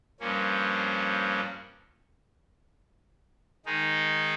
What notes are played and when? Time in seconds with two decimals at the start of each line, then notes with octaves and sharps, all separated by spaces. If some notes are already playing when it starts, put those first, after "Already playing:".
0.20 G2 F3 A#3 C#4
3.66 D#3 G#3 D#4